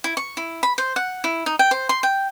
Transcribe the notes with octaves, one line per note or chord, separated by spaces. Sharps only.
E4
C#6
E4
B5
C5
F#5
E4
D#4
G5
C5
C6
G5